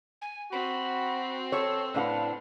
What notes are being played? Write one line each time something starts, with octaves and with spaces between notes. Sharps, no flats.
G#5
C4 F#4 B5
A4 C#5 E6
A2 D4 B4 F5 F#5